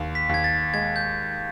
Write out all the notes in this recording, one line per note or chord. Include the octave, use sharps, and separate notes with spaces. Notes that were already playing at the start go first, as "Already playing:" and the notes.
Already playing: D#2
B6
D#2 G#6
A6
G#3 G#6
G6